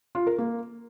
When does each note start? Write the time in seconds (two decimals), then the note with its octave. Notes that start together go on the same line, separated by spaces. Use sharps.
0.15 F4
0.27 A#4
0.38 A#3